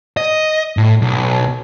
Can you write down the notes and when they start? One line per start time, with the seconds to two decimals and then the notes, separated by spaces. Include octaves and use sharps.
0.17 D#5
0.77 A2
1.02 B1